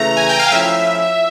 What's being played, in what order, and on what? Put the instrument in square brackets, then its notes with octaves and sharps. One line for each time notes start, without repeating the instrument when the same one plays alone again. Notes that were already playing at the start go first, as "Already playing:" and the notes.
Already playing: [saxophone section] C#3 E3 A3 [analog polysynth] A#5
[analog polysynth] G#5
G5
F5
[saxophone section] F3 A3 C#4 E4 [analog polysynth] E5